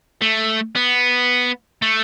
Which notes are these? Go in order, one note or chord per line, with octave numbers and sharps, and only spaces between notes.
A3
B3
A3